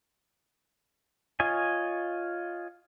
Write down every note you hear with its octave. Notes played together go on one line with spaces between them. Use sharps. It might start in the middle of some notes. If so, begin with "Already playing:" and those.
F4 C#5 D#5 G#5